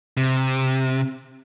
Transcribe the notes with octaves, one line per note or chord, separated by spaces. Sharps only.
C3